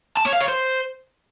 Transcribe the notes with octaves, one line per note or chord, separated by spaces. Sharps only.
A5
C#5
F5
C#5
C5